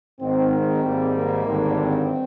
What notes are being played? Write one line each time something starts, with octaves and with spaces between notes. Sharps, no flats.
G#1 G#2 D#3 C4
C4
G#1 G#2 G3 A#3
A#3
G#1 G2 D3
C4